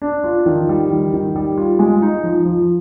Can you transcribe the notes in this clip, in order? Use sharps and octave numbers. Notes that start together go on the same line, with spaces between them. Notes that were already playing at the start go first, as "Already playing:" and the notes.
D4
F4
D#3
G3
D#3
D#3
G3
F4
G#3
D#4
F3
F3